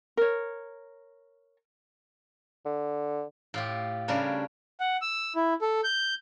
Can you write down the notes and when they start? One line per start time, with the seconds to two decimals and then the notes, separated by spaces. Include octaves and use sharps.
0.17 A#4 C#5
2.66 D3
3.54 A2 F4 G4
4.08 C#3 G3 D4 A#4 C#5
4.80 F#5
5.02 E6
5.36 E4
5.62 A4
5.84 G6